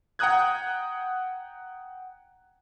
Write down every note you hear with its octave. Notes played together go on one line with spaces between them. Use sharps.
F#5 G5 A#5 D#6 F#6 G#6